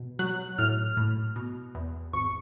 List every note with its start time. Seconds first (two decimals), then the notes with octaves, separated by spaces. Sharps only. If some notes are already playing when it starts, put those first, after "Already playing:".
Already playing: B2
0.19 F#3 F#6
0.58 A2 F6
0.97 A2
1.36 B2
1.75 E2
2.13 G#1 C#6